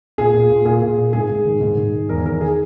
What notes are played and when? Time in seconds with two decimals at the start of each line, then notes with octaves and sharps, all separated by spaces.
0.18 A#2 G#4
0.34 A#2
0.50 A#2
0.65 A#2 G#4
0.82 A#2
0.97 A#2
1.13 G#2 G#4
1.29 G#2
1.45 D#3
1.61 G#2
1.77 G#2
1.94 D#3
2.09 E2 A#4
2.25 D#3 A#4
2.41 D#3 G#4